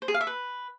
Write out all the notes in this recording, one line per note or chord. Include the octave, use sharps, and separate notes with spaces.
C5
G#4
F5
E5
B4